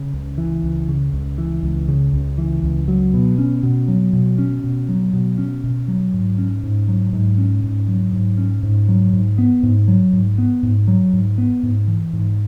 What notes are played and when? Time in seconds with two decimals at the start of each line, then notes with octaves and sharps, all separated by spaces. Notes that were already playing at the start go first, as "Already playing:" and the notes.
Already playing: C#3
0.13 C#2
0.38 E3
0.63 C#2
0.88 C#3
1.13 C#2
1.38 E3
1.63 C#2
1.88 C#3
2.13 C#2
2.38 E3
2.63 C#2
2.88 F#3
3.14 B2
3.38 C#4
3.63 B2
3.88 F#3
4.13 B2
4.38 C#4
4.64 B2
4.89 F#3
5.13 B2
5.38 C#4
5.64 B2
5.88 F#3
6.14 G#2
6.38 C#4
6.63 G#2
6.88 F#3
7.13 G#2
7.38 C#4
7.64 G#2
7.88 F#3
8.13 G#2
8.38 C#4
8.63 G#2
8.89 F#3
9.13 G#2
9.38 B3
9.63 G#2
9.88 F#3
10.13 G#2
10.38 B3
10.63 G#2
10.88 F#3
11.13 G#2
11.38 B3
11.63 G#2
11.88 E3
12.13 G#2